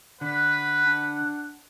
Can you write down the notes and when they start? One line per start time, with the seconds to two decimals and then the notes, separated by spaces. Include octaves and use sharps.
0.21 D3 B4 F#5
0.85 D4